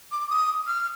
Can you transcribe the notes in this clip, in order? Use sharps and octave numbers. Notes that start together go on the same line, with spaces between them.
D6
D#6
F6